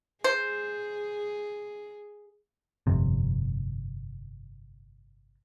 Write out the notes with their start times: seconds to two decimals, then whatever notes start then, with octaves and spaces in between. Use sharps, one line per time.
0.24 G#4 C5
2.87 G1 F2 C3